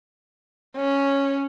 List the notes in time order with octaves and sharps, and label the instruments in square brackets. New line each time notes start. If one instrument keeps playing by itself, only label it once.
[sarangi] C#4